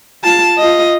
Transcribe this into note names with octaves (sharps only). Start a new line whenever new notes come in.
F4 A5
F4 D#5